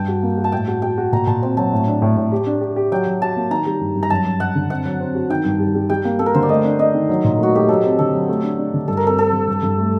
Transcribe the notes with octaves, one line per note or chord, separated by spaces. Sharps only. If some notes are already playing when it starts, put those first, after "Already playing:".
Already playing: G2 G5 A5
F#4
A#3
F#4
A5
A2 G5
F#4
F#4 G5
F#4
A#2 A#5
A#2 A5
C4 G5
F#3 A5
A2
D4
A2
A2
G4
D4
G4
G4
F#3 G5
F#3
F#4 A5
A#3
D#3 A#5
G3
G2
G2
A#5
F#2 A5
F#2
F#2 F#5
D3
C4 F#5
F#3
C4
F#4
D#3 G5
G2
G3
G3
G3 G5
A#3
A#3 A4
A#4
D3 C5
D5
A3 D#5
D4
D4 D#5
D#3
F#3
A#2
A3 F#4
A3 G4
F#3 A4
C4
D3 A4
F#3
A3
D4
D4
D3
G2 A4
A#4
C4 A4
C4 A4
G2
G2
G2
A3